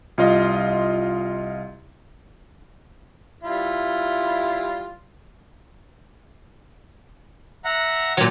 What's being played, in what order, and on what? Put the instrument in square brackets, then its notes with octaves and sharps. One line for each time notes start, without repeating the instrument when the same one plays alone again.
[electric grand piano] C2 F4 D#5
[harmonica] G3 E4 F4
[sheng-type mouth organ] E5 F#5 A#5
[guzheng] A#2 F#3